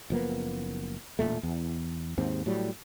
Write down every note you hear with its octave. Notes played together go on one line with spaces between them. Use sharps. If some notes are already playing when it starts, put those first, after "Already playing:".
F#1 F3 A#3 B3
E1 D#2 A#2 A3
E2
D#2 G#2 C4
A2 F#3 G3